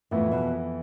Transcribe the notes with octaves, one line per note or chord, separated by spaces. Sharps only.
F2 A2 E3 B3 E4
B2